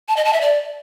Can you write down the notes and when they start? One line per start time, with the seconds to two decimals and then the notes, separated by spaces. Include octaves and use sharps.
0.08 A5
0.17 D#5
0.25 A5
0.33 E5
0.41 D5